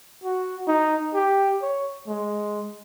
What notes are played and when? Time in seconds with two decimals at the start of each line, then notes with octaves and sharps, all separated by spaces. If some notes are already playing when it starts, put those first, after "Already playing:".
0.24 F#4
0.68 D#4
1.14 G4
1.62 C#5
2.08 G#3